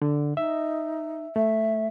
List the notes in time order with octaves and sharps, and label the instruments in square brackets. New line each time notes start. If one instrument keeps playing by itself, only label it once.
[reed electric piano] D3
[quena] D#4 [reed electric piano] E5
[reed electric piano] A3 [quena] E5